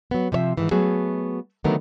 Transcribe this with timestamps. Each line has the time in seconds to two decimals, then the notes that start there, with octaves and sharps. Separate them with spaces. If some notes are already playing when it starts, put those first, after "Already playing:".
0.11 F#3 B3
0.32 C3 F3 C#5 E5
0.57 G#2 D#3 E3
0.71 F#3 A3 B3 F#4 G#4
1.64 D3 D#3 F#3 A3 B3 A#4